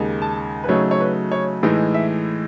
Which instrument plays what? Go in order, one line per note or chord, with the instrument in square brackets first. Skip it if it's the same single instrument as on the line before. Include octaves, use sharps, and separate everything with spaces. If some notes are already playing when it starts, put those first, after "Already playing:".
Already playing: [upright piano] D#2 C#3 G#3 D#4
A5
B4
C#3 F#3 A3 D#4 C#5
C#5
B4
C#5
A2 E3 G#3 D#4 D#5
E5